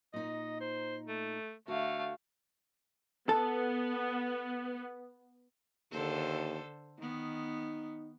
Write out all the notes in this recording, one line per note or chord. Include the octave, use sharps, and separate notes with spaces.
A#2 D#4 D#5
C5
A3
D3 A3 F#4 F5
B3 A4
D#2 D3 A4 C5
D#3 B3 D#4